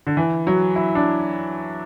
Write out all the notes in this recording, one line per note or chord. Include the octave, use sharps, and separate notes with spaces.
D3
E3
F#3
E4
D4